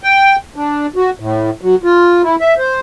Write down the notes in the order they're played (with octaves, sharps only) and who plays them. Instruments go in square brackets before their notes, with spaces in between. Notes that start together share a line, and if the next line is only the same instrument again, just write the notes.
[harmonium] G5
D4
F#4
A2
F#3
F4
E4
E5
C5